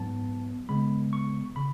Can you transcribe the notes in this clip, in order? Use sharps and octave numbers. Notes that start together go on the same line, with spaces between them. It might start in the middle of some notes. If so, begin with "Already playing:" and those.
Already playing: G#2 F#3 B3 A5
C#3 G#3 B3 B5
C#6
C#3 B5